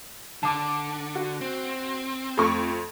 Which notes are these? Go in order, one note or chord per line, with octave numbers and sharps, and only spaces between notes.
D3 A5 D6
F#4
C4
F2 A3 C#6